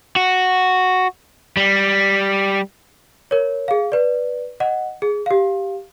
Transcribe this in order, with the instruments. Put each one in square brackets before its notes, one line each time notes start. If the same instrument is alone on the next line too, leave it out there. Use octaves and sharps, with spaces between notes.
[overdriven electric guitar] F#4
G3
[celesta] A#4 C#5
G#4 F5
B4 D5
D#5 F#5
G#4
G4 F5